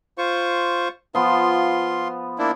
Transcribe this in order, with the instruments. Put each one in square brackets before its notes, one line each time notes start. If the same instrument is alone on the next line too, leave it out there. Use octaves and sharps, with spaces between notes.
[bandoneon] F4 C5 C#6
[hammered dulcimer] F3 B3 [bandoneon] F4 C6
[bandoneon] A#3 D4 E4